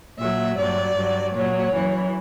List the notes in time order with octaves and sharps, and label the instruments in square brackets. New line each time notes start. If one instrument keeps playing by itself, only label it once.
[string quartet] A#2 F#3 E5
G2 F#3 D5
G2 F#3
A#2 F#3 C#5
F#2 E3